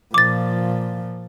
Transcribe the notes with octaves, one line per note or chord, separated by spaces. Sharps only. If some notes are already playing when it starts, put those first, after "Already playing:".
A#2 F3 D6 A6